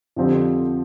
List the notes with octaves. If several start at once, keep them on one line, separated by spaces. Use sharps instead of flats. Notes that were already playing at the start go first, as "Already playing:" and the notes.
F2 D3 F3 C4 G4